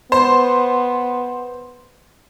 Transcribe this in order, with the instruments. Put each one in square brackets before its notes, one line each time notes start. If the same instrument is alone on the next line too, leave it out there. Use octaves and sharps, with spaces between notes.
[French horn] B3 [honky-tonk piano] C5